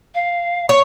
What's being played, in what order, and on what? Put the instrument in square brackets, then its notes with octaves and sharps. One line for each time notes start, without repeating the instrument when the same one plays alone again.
[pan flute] F5
[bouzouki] C#5 [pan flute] C#6